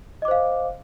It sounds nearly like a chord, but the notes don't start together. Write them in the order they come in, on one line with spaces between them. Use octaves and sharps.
D#5 D6 C5 F5